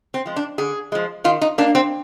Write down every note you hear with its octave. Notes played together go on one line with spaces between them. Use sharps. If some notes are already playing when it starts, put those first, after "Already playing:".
C4
F3 G#3
D4
D3 G#4
F3 G#3
D#3 F4
D#4
A#3 D4
C4